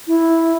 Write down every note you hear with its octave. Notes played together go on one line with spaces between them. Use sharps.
E4